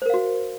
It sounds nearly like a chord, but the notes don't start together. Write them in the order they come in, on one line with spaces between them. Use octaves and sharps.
C5 A#4 F5 F#4